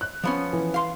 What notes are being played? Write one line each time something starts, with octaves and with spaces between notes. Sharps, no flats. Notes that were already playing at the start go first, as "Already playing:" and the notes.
F#6
F3 B3 C#4
E3
F5 C6